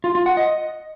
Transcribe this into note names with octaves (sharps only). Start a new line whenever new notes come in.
F4
F4
F#5
D#5